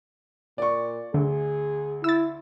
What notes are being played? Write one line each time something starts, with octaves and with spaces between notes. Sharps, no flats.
A#2 D5 C#6
D2 D3 G#4
E4 E6 A6